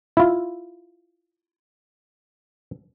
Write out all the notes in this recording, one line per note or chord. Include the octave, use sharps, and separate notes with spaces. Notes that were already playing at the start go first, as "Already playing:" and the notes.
E4 F4